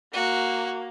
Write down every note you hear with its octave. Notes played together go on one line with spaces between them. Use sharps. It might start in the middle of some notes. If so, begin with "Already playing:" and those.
A#3 F#4